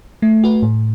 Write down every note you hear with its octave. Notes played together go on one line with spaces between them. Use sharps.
A3
F#4 B4
A2